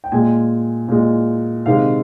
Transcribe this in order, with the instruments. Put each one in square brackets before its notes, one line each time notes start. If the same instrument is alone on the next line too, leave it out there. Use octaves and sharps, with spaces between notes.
[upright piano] G5
A#2 G#3 G#5
A#2 G#3
C3 D#3 G#3 F5